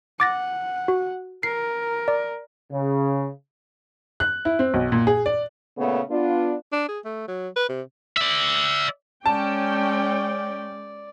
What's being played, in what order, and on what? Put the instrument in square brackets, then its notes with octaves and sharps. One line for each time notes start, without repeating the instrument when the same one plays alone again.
[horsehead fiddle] F#5 [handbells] D6 A6 A#6
[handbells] F#4
[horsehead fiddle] A#4 [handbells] C7
[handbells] D5
[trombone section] C#3
[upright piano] F#6
E4
C4
B1
A#2
G#4
D5
[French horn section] A#2 C#3 A3 B3
B3 D4 F4
[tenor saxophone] D4
G#4
A3
F#3
B4
C3
[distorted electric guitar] D5 E5
[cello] G#3 [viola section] C#4 G5 [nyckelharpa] D5 [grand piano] A5